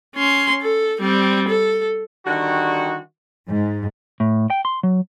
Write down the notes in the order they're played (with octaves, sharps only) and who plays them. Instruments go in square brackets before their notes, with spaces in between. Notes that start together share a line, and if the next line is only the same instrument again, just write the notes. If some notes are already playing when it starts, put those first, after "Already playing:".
[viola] C#4 C6
A4
G3 C4
A4
[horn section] D3 D#3 G3 F#4
[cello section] G#2
[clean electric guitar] A2
G5
C6
F#3